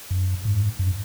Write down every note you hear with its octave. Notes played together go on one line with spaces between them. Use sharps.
F#2
G#2
F#2